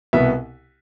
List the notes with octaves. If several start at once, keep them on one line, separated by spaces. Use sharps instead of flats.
C2 B2 B3 E5